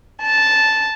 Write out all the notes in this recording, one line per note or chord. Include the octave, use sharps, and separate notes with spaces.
A5